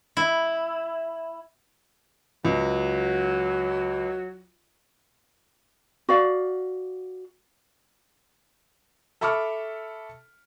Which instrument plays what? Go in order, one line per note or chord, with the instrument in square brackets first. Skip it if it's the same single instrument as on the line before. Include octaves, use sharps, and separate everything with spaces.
[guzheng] E4
[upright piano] C#2 [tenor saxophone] F#3
[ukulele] F#4 D5 F5
[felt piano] A4 E5 B5 C#6 D6 F6